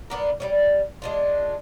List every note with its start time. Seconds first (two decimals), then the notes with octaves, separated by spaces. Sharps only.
0.10 A#3 B3 D4
0.40 G3 A3 C#4
1.02 G#3 D4 F4